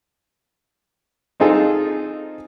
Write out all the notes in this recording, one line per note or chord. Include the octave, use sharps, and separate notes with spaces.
C4 D#4 F4 G#4 A4